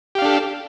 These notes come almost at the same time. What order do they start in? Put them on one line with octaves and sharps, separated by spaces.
G4 F5 D4 A4